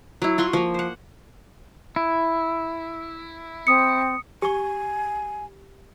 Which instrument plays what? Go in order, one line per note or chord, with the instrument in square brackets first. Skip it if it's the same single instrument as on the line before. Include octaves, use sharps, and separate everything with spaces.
[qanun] F#3 E4
F4 F#4 C6 C#6
F3 A#3
C5 F#5
[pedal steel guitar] E4
[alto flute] C4 [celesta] D#6 C#7
[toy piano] G4 C#6 [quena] G#5